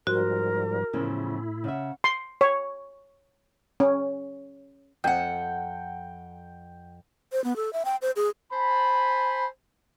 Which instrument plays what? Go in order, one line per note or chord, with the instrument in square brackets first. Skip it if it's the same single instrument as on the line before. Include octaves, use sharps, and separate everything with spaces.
[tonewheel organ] G#2 F3 G3 [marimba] F#4 [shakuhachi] A#4 [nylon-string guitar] C5
[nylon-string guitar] E2 C#3 F3 [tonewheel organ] A2 E4
[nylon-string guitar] C#3 E5 [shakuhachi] F#5
[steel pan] C6
C#5
C#4
[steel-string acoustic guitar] F2 F#5 [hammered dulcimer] G5
[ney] C5
B3
A4
E5
G5
C5
G#4
[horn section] C5 G#5 A5 B5